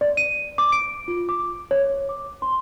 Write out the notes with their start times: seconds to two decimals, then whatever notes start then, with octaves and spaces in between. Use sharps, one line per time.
0.01 D5
0.17 D#7
0.58 D6
0.72 D7
1.08 F4
1.29 D6
1.71 C#5
2.09 D6
2.42 C6